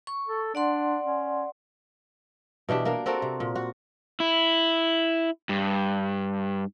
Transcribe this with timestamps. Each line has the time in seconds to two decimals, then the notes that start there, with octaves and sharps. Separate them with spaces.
0.07 C#6
0.27 A4
0.55 D4 D5 F#5 C6
1.04 C#4
2.69 B2 E3 D4 G4
2.85 A#3 D4 A#4
3.06 C4 F#4 A4 A#4
3.22 C3
3.40 A#2
3.55 F#4 F#5
4.20 E4
5.49 G2